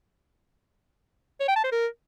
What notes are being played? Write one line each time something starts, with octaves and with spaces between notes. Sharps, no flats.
C#5
G5
A5
C5
A#4